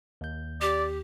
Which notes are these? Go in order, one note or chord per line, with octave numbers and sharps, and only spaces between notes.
D#2 G6
G4 D5